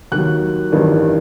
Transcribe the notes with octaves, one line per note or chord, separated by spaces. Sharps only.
D#2 D#3 F#3 F#6
A1 G2 D#3